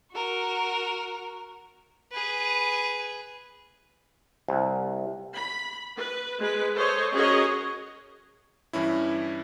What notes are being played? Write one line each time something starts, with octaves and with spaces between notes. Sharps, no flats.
F#4 A#4
G#4 B4
C2
B5
B4
G#3 B4
A4 C5 C#5 D#5
C#4 F#4 G#4 A#4 C#5 D#5
G2 E3 C#4 E4